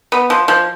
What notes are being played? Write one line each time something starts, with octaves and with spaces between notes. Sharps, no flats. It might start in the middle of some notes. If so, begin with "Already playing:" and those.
B3
F3
F3